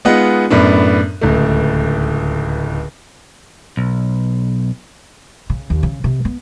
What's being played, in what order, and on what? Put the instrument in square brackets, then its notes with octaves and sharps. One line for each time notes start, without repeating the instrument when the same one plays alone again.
[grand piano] G#3 B3 D#4 F4 D#5 F#5
F#2 A2 B3 D4
D1 C#2 A3
[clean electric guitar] B1
[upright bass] C#3
D#2
C#3
C3
B3